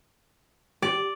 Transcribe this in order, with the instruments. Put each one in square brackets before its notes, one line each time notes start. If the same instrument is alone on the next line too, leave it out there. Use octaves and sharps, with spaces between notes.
[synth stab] G4 [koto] D5